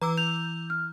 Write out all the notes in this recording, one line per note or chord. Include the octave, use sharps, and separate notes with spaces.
E3 B4 A#5 D6 E6
G6 F7
F6